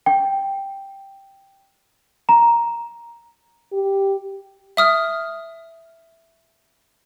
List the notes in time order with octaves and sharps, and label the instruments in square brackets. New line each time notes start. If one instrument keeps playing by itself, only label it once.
[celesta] G5
A#5
[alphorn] G4
[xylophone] E5 D#6 F6